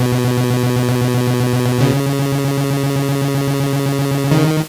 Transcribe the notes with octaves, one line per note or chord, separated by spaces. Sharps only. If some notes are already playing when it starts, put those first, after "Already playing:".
Already playing: B2
C#3
D#3